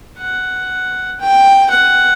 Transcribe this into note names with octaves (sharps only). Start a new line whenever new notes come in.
F#5
G5
F#5